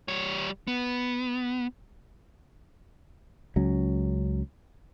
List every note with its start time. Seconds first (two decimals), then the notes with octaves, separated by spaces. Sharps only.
0.08 G3 C#5
0.67 B3
3.56 C#2 F#3 C#4